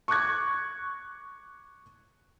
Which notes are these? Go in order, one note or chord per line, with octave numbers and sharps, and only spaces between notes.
C#6 D6 F#6 G#6